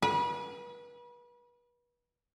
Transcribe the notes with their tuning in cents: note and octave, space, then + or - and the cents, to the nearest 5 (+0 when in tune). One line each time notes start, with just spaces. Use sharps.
B4 -35